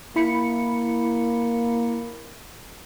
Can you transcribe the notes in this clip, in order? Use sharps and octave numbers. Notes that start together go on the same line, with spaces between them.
A#3 E4 B5 C#7